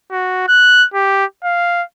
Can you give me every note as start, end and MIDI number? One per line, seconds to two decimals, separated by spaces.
0.12 0.48 66
0.48 0.86 90
0.94 1.25 67
1.44 1.83 77